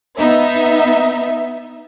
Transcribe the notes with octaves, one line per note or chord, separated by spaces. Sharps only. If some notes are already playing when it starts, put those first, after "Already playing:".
B3 D#4 E5